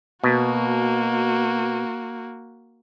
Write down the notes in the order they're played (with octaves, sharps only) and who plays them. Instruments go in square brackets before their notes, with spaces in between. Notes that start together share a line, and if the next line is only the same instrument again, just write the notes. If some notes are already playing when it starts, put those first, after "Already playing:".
[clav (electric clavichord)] B2 [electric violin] A#3 F#4